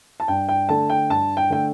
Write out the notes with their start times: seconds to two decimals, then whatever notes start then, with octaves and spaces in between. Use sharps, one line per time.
0.20 A5
0.28 G2 G5
0.49 G5
0.69 D3 A3 A5
0.90 G5
1.10 G2 A5
1.37 G5
1.50 D3 A3 G5